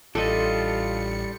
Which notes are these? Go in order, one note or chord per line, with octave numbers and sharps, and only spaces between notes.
A1 G3 D4 F4 A4 D#5 C#7